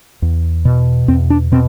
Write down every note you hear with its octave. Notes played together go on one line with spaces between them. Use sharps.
E2
B2
E2 C4
D4
B2 C4